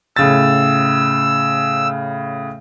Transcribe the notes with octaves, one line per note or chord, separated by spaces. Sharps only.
A2 C#3 E6 A6